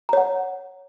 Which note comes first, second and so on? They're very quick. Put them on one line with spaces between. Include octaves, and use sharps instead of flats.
A#5 C#5 F#5